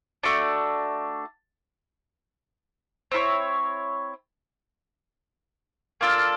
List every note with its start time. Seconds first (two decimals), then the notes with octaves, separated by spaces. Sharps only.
0.23 A3 D4 F#4
3.12 C4 E4 A4 C#5
6.01 A#3 D4 F4 A4